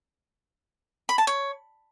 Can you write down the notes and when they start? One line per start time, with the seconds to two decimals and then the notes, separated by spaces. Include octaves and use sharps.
1.09 B5
1.18 A5
1.27 C#5